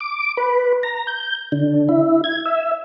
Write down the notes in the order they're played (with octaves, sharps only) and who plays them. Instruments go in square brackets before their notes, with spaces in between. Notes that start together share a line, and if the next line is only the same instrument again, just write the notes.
[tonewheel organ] D6
B4
A#5
G6
D3
E4
G#6
E5